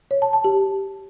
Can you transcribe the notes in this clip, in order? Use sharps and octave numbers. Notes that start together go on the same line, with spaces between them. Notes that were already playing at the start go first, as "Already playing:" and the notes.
C#5
A5
A5
G4